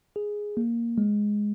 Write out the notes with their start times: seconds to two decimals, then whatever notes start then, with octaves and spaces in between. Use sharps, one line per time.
0.16 G#4
0.57 A#3
0.98 G#3